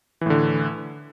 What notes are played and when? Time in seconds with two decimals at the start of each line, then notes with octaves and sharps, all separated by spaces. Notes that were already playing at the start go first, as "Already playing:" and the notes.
0.21 E3
0.26 A2
0.30 D3